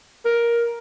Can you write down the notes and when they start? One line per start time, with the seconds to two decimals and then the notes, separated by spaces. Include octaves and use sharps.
0.25 A#4